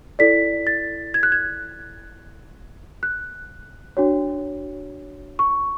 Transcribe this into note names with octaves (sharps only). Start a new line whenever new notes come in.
E4 A4 D5 B6
A6
G#6
F#6
G#6
F#6
D4 F#4 C#5
C#6